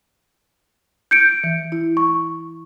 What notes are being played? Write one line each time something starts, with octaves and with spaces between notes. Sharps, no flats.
G6 C#7 D7
E3
E4
C#6